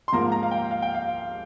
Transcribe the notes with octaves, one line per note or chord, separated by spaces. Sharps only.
C6
G#2 F3 A#3 A#5
A#5
F5
G5
F5
G5
F5